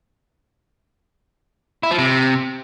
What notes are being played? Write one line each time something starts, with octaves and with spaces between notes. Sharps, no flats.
E4
F3
C3